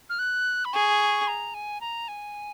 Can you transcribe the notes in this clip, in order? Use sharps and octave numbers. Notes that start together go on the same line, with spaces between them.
F6
F#6
B5
G#4 C#6
A#5
G#5
A#5
G#5